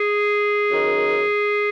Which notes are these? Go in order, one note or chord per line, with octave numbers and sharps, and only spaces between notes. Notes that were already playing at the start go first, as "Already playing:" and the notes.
Already playing: G#4
F#2 D#3